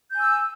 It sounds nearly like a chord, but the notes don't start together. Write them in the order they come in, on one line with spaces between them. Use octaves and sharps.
G6 G#5 E6